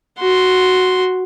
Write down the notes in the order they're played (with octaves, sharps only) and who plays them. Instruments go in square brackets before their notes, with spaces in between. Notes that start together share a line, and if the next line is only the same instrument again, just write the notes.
[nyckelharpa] F#4 C6